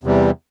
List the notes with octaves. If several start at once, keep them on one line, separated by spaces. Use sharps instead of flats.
E2 C3 E3 G3